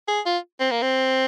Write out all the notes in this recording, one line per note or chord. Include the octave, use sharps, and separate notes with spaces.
G#4
F4
C4
A#3
C4